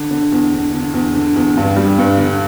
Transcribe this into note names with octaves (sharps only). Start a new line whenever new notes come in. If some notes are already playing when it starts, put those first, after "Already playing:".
Already playing: D3
D3
E2
D3
D3
E2
D3
E2
G2
G3
G2
D3